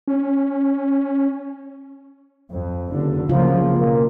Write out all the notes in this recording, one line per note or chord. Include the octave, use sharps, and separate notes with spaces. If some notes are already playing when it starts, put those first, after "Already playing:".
C#4
F2
F#1 D3
C#2 C#3 F3 F#3 A#3 F4
B2 A#3